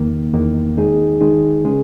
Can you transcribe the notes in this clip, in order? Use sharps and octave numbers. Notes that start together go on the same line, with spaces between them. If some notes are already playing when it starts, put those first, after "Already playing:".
Already playing: E2 D#3 A#3
E2 D#3 A#3
D#3 G#3 D#4 G#4
D#3 G#3 D#4 G#4
C#3 G#3 C#4 G#4